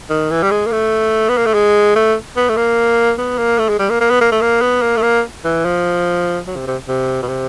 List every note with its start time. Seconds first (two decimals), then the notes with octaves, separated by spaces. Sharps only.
0.10 D#3
0.30 E3
0.43 G3
0.51 G#3
0.66 A#3
0.72 A3
1.29 B3
1.37 A#3
1.46 A3
1.54 G#3
1.96 A3
2.37 B3
2.49 A3
2.57 A#3
3.18 B3
3.38 A#3
3.59 A3
3.69 G#3
3.79 G3
3.90 A#3
4.01 A#3
4.11 B3
4.21 A#3
4.32 A3
4.42 A#3
4.61 B3
4.82 A#3
4.97 A3
5.02 A#3
5.45 E3
5.65 F3
6.47 F#3
6.57 C3
6.67 C3
6.88 C3
7.22 B2
7.29 C3